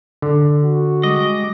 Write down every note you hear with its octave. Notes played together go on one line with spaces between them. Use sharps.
D3
F#4
G3 G#3 D#5 D6